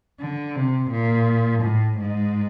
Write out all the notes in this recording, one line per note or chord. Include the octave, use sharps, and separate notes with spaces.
D3
C3
A#2
A2
G#2